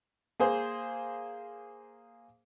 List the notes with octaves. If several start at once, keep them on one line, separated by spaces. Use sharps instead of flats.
A#3 G#4 C5